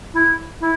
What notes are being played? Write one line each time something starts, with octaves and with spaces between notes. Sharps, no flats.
E4
E4